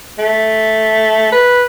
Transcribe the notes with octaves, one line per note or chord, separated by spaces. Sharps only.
A3
B4